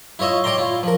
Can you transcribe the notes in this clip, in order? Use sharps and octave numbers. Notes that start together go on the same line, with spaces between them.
E4 F4 C#5 D#5 E5
C#5 D5 G5 A#5 C6
E4 F4
F3 A#4